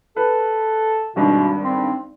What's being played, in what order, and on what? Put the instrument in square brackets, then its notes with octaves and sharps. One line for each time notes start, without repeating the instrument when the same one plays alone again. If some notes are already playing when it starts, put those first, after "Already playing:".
[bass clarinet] A4 [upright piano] B4
[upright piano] G#1 G2 [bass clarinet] B2
[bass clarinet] C4